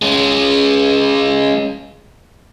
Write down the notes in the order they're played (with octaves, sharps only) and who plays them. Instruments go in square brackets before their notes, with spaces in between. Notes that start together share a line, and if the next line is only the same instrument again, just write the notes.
[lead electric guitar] G#3 C#4